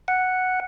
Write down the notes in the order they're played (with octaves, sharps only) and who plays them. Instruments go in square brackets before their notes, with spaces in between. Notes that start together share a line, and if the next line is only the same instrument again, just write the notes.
[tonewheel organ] F#5